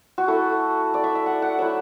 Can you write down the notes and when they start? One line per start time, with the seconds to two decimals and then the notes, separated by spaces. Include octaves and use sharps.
0.18 F#4
0.28 A3 E4 A4
0.94 D5
1.04 E5
1.15 E5
1.26 F#5
1.42 F#5
1.58 F#3 A3 E4 E5